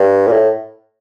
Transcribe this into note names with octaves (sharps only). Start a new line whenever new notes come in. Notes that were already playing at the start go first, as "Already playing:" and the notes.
Already playing: G2
A#2
A2